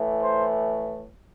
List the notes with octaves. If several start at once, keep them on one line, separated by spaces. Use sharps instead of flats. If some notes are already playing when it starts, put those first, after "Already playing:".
Already playing: A2 E3 A3
C5